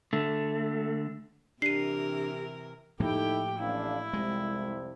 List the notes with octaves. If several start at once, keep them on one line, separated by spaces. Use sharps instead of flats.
D3 A3
C3 E3 D4 G4 A#4 C7 D#7
A2 F3 A#3 D#4 E4 G4 A4 G5
A1 D4 E4 F5
C2 F2 C3 G#3